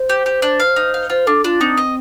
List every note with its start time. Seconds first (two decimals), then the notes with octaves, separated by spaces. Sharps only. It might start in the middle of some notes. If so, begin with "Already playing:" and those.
Already playing: C5
0.09 G4
0.26 G4
0.42 D4
0.60 F5
0.76 D#4
0.94 F5
1.10 F4 C5
1.27 D4 A4
1.44 D4 F4
1.61 C4 D#4
1.77 D#5